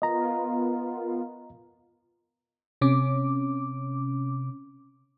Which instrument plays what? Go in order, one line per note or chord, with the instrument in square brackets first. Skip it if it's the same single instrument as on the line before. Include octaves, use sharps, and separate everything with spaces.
[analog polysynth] B3 F4 A#4 [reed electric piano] D#5 A#5
[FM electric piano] C3 C#4 D6